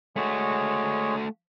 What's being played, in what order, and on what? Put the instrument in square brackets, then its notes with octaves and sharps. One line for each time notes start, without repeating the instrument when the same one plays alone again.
[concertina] G#3 C#5 [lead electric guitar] A3 F#4